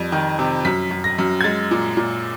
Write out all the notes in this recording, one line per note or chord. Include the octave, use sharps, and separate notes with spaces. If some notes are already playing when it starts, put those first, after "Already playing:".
Already playing: F2 G3
D#3
C3
F#2 B6
F#2
A#6
F#2
G#6
G#3 A6
A#2
A#2